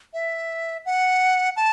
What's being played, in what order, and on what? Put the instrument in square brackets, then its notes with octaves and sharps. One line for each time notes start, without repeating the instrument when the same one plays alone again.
[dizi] E5
F#5
A5